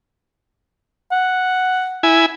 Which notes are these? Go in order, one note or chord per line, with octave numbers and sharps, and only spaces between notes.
F#5
E4 G#5